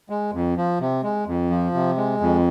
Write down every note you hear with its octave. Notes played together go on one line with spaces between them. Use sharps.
G#3
F2
F3
C3
G#3
F2
F3
C3
G#3
F2